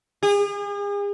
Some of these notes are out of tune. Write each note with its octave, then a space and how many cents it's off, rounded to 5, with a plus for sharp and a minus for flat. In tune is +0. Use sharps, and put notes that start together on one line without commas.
G#4 -40